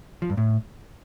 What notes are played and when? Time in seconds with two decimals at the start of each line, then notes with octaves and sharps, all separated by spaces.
0.22 F3
0.30 G2
0.37 A2